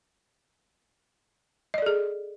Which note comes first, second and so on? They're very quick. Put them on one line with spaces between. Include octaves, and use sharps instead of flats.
D#5 D5 A4 G#4